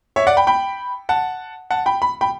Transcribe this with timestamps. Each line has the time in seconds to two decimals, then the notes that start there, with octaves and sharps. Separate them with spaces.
0.16 C#5 E5
0.27 D5 F#5
0.37 G5 B5
0.47 G5 B5
1.09 F#5 A5
1.70 F#5 A5
1.86 G5 B5
2.02 B5
2.21 G5 B5